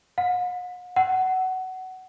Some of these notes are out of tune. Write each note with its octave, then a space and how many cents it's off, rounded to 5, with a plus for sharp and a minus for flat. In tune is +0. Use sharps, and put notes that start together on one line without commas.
F#5 -45
F#5 +20